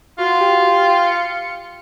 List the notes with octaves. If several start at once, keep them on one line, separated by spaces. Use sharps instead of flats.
F4 F#4
G4
C#7